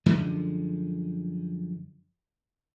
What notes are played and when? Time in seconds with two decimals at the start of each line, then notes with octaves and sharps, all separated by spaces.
0.06 F#2 D3 F3 G#3